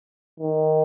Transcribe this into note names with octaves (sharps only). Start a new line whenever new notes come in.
D#3